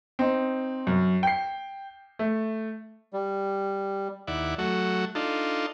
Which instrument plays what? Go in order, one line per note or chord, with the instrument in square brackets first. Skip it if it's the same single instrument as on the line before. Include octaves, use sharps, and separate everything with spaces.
[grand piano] C4 D#4
F#2
G5 C7
A3
[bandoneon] G3
[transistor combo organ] D#2 E4 D5 F#5
F#3 A3 F#4
D4 D#4 F4 A4